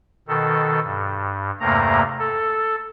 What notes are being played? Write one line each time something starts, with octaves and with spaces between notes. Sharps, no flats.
B2 D#3 A4
G2
E2 G2 C3 A3 A#3 A#5
A4